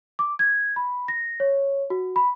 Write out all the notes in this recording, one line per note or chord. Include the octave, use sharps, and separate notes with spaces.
D6
G#6
B5
A#6
C#5
F#4
B5